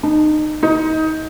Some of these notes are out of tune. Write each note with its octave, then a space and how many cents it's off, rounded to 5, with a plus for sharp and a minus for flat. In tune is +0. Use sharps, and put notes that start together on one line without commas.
D#4 -25
D#4 +20